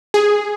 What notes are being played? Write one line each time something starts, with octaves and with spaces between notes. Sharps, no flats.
G#4